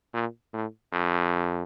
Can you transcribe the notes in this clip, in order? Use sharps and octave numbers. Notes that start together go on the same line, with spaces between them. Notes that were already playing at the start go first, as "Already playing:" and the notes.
A#2
A2
F2